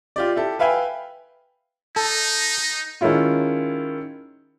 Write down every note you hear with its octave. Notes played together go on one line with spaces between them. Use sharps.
F4 G4 D5
E4 G4 A4
B4 E5 F5 G5 G#5 B5
D#4 A4
D#3 G#3 C#4 E4 F4